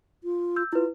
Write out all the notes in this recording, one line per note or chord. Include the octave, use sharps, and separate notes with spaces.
F4
E6 G6
E4 F4 B4